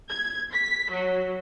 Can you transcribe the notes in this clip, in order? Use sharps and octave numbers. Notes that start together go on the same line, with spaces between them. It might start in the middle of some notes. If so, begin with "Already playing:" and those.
G#6
B6
F#3